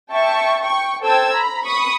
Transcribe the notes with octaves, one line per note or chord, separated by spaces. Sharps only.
E5 G5 A5 C#6
G5 C#6
A4 C5 G5 A5 E6 G#6
A#5 B5
B5 C#6 D#6